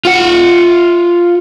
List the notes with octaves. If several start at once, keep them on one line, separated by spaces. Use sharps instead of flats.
F4 F#5